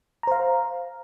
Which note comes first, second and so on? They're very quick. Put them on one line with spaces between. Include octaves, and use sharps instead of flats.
A#5 C5 F5